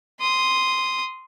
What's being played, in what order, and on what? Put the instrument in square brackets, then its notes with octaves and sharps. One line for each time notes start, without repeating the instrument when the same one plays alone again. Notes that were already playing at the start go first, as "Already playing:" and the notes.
[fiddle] C6 D#6